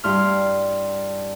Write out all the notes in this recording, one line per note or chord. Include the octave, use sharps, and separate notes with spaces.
G2 E4 C6 F6